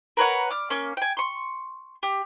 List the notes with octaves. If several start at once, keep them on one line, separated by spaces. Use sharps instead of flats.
A#4 B4 C#5 F#5
D5 F6
A#3 C#4
G5 G#5
C6 C#6
G4